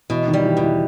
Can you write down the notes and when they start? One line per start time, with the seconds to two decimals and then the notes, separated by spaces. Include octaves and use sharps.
0.10 B2 E3
0.27 D#3
0.33 G3
0.44 E3
0.57 B2
0.62 E3